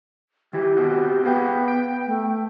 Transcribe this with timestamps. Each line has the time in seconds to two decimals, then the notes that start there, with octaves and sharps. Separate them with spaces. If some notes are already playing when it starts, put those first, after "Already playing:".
0.53 D#3 E4 G4
0.77 B3 C4 F#4
1.25 B3 G#4 F5 G5
1.68 G5
2.07 A3